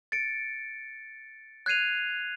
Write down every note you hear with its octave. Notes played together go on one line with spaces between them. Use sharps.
A6 C#7 D7
F#6 G#6 C7 D#7 F7